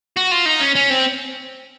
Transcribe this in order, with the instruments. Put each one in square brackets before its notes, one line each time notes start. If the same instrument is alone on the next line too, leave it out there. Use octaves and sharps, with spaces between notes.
[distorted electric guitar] F#4
F4
D#4
C#4
C#4
C4